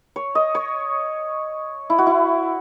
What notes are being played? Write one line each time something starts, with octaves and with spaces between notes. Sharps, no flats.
C#5
D#5
C#5
E4
F#4
E4